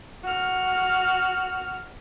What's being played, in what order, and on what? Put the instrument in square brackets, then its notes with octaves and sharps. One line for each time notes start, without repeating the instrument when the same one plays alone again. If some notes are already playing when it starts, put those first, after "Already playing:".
[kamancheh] F#4 F6